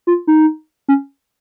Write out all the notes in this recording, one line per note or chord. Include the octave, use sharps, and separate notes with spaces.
F4
D#4
C#4